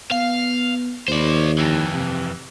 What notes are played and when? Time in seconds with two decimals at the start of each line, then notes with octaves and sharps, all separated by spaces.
0.11 B3 F5
1.08 D#2 C5 D5
1.58 F2 E3
1.94 C3